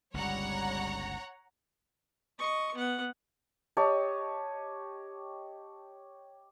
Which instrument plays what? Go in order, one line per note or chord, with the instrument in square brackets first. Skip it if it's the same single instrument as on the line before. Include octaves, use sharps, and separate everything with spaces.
[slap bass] G1 C#2 [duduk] G3 [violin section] C#5 F#5 A#5
[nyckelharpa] D#5 C#6
B3 F#5
[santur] G4 C#5 D#5 A5